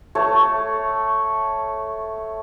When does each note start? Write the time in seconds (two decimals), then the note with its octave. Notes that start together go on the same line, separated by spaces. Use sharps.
0.15 A3 C#5